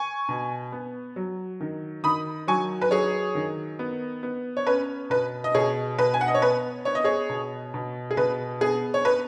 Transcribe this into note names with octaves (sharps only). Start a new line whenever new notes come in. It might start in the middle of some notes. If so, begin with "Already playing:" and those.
Already playing: G#5 C#6
B2
B3
F#3
D#3
D#3 B5 D#6
F#3 G#5 C#6
B4
F#3 G#4 C#5
D#3
B3
B3
C#5
C#4 B4
B2 B4
D#5
B2 G#4 C#5
B2 B4
G#5
F#5
D#5
C#5
B3 B4
B3 C#5
D#5
G#4 C#5
B2
B2
G#4
B2 B4
B3 G#4
C#5
B3 B4